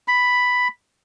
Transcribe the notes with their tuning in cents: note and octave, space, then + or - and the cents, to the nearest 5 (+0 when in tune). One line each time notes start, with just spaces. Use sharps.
B5 +5